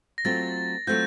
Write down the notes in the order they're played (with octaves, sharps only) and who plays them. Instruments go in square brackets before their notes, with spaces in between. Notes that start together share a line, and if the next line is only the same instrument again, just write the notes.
[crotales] A#6
[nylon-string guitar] F#3 A3 C4 F4 [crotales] A6
[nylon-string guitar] F#3 A3 C4 F4 [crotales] G6